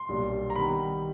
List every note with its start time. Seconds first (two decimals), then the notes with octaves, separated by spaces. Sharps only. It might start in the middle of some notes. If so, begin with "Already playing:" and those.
Already playing: C6
0.09 B1 A#2 G3 A#3 D4
0.50 A#5
0.56 D#3 G3 B3 B5